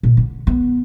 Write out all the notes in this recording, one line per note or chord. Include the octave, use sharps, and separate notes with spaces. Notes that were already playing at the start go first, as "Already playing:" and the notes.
A#2
D3
B3